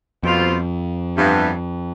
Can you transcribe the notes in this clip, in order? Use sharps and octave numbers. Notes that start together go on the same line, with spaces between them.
F2 B2 G3 C4 F4
G2 E3 B3